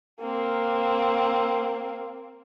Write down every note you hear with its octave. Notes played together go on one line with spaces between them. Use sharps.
A#3 C4